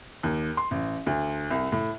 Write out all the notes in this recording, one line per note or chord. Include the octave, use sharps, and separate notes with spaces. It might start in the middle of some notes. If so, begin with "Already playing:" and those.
D#2
C6
A1
D2
C2
A2